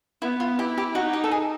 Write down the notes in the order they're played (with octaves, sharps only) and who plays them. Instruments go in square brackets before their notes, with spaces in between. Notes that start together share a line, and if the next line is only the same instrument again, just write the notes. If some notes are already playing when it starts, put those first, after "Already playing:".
[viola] B3 [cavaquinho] E4
[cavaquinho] F4
[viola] E4 [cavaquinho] G4
[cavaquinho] G4
[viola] D#4 [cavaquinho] F#4
[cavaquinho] G4
A4
G#4